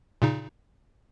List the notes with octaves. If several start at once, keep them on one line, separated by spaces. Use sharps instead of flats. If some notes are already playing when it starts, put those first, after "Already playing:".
A#2 C#3 D#4